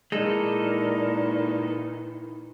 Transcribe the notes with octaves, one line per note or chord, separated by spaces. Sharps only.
A#2 D#3 E3 G#3 D#4 A4 A#4 D5